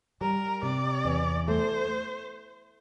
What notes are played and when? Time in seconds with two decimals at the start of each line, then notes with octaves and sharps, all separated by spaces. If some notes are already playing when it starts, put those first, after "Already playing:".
0.21 G3 A#4
0.63 C3 D5
1.05 E2
1.47 A3 C5